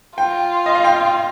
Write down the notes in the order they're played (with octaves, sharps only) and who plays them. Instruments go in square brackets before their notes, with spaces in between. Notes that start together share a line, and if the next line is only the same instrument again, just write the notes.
[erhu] F4 [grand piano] G5
[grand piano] D#5
F5
G5